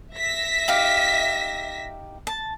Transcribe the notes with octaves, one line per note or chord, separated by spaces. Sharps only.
E5 A#6 B6
D#4 G4 F5
A5